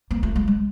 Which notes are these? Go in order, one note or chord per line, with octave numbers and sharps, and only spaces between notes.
A#3
A3
G#3
G#3